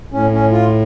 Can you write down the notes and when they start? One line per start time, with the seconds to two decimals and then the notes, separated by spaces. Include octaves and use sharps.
0.12 A2 C#4
0.32 C#4
0.51 F4